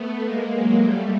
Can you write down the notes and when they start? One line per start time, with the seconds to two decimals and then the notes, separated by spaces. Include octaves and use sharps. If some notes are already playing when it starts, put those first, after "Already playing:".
Already playing: A3 B3
0.25 G#3 A#3
0.54 F#3 G#3
0.83 G3 A3